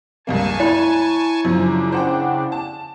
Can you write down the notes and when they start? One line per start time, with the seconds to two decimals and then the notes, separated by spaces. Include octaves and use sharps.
0.27 C#2 G2 A#3 G#5 A5 C#6
0.60 E4 C#5 B5
1.45 F#2 C#3 F3 D4
1.92 C5 F#5 G5
2.52 A5